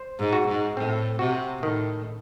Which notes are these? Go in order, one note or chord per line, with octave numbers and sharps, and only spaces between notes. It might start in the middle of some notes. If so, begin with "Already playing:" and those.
Already playing: C5
G#2
F#4
G#2
A2 C4
C3 F#4
A2 D#3